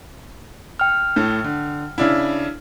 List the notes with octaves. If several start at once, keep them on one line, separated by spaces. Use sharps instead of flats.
G5 F6
A2 A3
D3
C#3 D4 E4